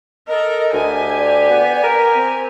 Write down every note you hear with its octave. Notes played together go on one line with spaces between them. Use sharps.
A4 A#4 D#5
D2 G4 G#5
D5
B3
A#4
C4